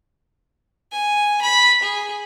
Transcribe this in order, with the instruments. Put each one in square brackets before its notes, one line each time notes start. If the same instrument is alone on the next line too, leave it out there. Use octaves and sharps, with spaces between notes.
[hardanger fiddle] G#5
B5
G#4